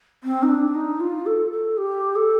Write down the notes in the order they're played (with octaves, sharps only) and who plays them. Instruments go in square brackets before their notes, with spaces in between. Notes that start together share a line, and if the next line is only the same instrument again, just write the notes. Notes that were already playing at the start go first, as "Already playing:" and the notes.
[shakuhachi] C4
D#4
D4
D#4
F4
A4
A4
G4
A4